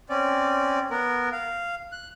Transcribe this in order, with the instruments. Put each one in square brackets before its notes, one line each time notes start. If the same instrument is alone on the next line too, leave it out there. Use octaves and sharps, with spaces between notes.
[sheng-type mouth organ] C4 C#4 D5
B3 A#4
F5
F#6